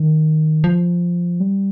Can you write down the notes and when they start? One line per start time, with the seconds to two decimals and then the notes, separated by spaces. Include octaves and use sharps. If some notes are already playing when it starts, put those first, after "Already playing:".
Already playing: D#3
0.64 F3
1.40 G3